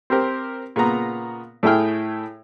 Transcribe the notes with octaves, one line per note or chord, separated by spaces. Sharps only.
C4 G4 A#4 C5
A#2 C#3 B3 A#5
A2 A3 E4 G#4 G5 F6